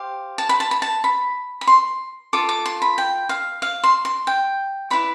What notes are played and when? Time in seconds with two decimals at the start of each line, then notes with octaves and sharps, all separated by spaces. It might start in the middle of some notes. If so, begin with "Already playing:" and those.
Already playing: G4 C5 F5
0.38 A5
0.49 B5
0.60 A5
0.71 B5
0.82 A5
1.04 B5
1.61 B5
1.67 C6
2.33 F4 A4 D6
2.49 D6
2.66 C6
2.82 B5
2.98 G5
3.29 F5
3.62 F5
3.84 C6
4.05 C6
4.27 G5
4.90 E4 B4 D5 B5